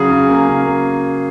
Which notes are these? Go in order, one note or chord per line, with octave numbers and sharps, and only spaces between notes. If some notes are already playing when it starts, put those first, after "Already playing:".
Already playing: C#3 F#3 G#4
C#3
A#3
C#3
A#3